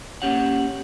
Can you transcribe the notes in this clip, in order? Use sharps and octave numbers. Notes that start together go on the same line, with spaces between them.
A#3 C#4 G4 C#5 F#5